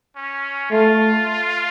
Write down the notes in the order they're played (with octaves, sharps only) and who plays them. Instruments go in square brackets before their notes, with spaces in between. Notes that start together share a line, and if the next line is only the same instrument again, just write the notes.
[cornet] C#4
[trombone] A3 [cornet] F4